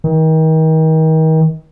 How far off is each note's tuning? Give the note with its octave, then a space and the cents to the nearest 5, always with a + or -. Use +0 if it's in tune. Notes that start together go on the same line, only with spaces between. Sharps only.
D#3 +35